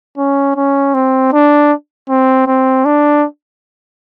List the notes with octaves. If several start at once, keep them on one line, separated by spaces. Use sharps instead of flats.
C#4
C#4
C4
D4
C4
C4
D4